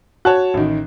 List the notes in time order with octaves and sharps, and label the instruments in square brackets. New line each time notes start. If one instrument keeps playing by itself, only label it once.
[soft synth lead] F#4 [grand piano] C#5 A5 F#6
[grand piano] A1 D#3